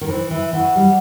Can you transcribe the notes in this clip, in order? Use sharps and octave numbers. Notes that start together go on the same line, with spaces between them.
D#3
E3 C5
E3 E5
E3 F#5
G3